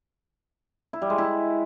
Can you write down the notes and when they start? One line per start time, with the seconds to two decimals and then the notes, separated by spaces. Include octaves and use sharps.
0.93 E4
1.02 G3
1.10 G#3
1.18 E4